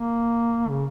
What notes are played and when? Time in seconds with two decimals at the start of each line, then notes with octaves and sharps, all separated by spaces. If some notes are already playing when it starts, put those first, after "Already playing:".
Already playing: A#3
0.69 C#3